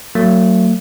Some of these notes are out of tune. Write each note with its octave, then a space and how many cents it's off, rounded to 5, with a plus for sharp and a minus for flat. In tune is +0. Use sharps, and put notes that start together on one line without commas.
F#3 +0 A3 +45